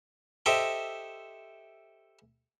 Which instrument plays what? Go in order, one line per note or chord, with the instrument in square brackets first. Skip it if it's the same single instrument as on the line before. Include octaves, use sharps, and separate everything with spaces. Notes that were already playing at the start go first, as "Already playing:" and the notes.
[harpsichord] G4 A4 C5 D#5 E5 G5